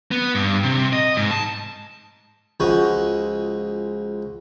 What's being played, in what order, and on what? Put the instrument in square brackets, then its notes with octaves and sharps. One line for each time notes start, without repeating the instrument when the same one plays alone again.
[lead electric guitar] B3
G2
C3
D#5
G#2
A5
[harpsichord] C#2 F3 G#3 F#4 D#6